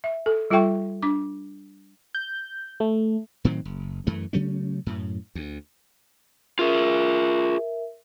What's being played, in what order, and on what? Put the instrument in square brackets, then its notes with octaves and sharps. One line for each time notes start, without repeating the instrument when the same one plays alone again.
[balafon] E5
A4
G3 F4 A4 E5 G5 C#6
D4 D6
[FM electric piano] G6
A3
[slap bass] A2 D#3 F#3 C4
F#1
F#2 E3 A3
C#3 F#3 A3 C#4
F#2 A2
D2
[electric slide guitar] F4 G#4 [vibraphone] A#4 E5